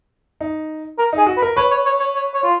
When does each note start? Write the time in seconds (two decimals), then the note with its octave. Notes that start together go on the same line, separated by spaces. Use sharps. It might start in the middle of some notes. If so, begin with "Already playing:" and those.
0.41 D#4
0.99 A#4
1.13 D#4
1.18 G#4
1.26 F#4
1.37 B4
1.42 A#4
1.57 B4 C#5
1.71 C#5
1.86 C#5
2.00 C#5
2.15 C#5
2.34 C#5
2.44 F4